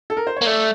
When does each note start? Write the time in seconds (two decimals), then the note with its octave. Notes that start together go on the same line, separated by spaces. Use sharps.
0.10 A4
0.17 A#4
0.27 C5
0.36 C#5
0.41 A#3
0.46 A3 D5